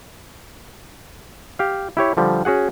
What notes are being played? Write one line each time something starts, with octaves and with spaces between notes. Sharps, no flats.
G4 F5
E4 G4 C#5
D3 F3 G3
C#4 F#4 G#4 F#5